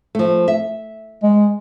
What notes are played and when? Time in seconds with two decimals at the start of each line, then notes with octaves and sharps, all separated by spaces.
0.15 F3 A3
0.48 E5
1.23 G#3